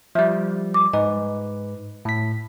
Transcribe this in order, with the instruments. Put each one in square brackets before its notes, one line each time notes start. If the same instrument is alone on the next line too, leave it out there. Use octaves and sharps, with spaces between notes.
[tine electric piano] F3 G3 [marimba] E5
[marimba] D6
[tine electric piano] G#2 B4 [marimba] D#5
[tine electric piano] A2 B6